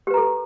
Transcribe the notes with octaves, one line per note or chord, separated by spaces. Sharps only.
G4 A4 B4 A#5